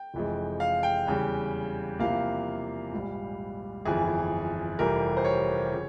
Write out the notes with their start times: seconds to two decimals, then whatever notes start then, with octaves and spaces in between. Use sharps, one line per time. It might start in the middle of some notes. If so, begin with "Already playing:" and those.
Already playing: G5
0.14 F1 F2 E3 G#3
0.60 F5
0.83 G5
1.07 E2 C#3 G3
1.99 E2 C3 F3 A#3 F5
2.92 A#1 G#2 G3
3.85 G1 F2 E3 G#4
4.79 F1 F2 E3 G3 A#4
5.17 C5
5.25 C#5
5.72 C#3 F3